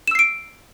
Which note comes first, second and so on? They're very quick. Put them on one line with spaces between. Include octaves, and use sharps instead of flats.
E7 E6 C7 D7